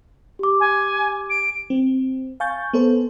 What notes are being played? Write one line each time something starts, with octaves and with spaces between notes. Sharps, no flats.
G4 D6
G#5
D7
C4
F5 G#5 C#6 G6 A6
B3 A4 C5